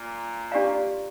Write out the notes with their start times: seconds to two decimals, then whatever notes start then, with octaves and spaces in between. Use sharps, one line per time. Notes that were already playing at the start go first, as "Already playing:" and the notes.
Already playing: A#2
0.51 D4 G4 D5 F5 A#5